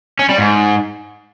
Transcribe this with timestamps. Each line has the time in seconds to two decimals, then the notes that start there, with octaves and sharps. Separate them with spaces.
0.19 C#4
0.29 G3
0.38 G#2